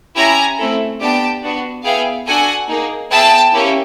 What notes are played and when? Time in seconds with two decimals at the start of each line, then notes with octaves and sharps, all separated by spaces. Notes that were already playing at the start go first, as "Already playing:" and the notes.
0.15 C#4 E4 G4 G#5 A#5
0.58 A3 C4 E4 A4
1.00 B3 D4 G4 G5 A5
1.42 B3 D4 F#4
1.84 B3 E4 G#4 F5 G5
2.26 D4 F#4 A4 F#5 G#5
2.68 A#3 D#4 G#4
3.10 B3 E4 G#4 G5 A5
3.53 A#3 C#4 E4 G4